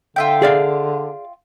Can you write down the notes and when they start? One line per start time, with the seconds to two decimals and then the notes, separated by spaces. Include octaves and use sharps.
0.16 D3 F4 E5 G5
0.42 G#4 D5 F5